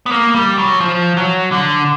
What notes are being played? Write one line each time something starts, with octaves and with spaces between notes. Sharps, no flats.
B3
A#3
G3
F#3
F3
F#3
D3